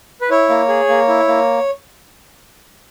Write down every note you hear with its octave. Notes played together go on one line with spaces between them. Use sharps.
B4
E4 C#5
A#3
G#4
A#3
E4
A#3